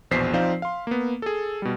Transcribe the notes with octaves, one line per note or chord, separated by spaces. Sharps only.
A#1 E2 B2 C5 B6 C7
F3 C4 D#4 C5 D5 F5
F5 C6
A#3 B3
G#4 A4
B2 G3